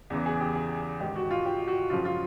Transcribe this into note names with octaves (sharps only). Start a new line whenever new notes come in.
E2 C#3 E3
G#4
G4
G#4
G#2 D#3 G4
F#4
F4
G4
F#4
F#2 C#3 F3 F4
F4